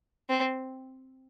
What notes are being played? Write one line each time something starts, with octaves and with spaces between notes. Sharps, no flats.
C4